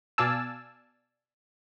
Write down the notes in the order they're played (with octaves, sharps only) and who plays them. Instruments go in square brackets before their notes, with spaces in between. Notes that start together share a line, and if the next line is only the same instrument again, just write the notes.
[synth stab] B2 D5 F5 G#5 A5 E6